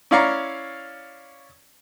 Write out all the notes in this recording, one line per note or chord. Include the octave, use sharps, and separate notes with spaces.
C#4 E4 D5 F5 A#5 C#6